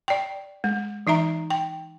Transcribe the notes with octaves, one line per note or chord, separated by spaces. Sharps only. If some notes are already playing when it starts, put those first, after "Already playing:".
D5 G5
G#3
E3 D#4 E5 A#5
G5